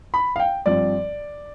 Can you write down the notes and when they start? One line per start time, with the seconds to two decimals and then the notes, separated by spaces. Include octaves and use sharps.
0.14 B5
0.36 F5
0.40 G5
0.66 G2 F3 C4 D5